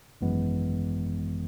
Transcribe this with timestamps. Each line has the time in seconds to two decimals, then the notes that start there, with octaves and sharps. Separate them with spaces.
0.21 G#1 F#2 E3 G#3 B3